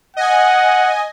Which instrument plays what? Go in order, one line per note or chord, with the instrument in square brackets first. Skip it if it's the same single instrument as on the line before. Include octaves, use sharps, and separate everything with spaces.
[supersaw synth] D#5 G#5 [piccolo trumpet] F#5